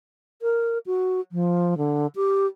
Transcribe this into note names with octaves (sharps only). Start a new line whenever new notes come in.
A#4
F#4
F3
D3
G4